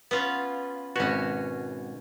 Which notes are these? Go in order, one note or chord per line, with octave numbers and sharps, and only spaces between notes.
B3 C#4 F4
G#1 B2 C#4 F#4